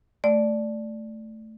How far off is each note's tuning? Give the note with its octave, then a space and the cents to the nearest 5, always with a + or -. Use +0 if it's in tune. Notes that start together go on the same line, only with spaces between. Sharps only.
A3 +0 D5 +0